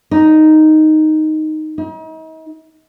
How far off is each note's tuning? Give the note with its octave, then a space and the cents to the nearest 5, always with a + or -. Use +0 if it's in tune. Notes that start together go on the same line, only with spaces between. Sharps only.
D#4 +0
D#4 +40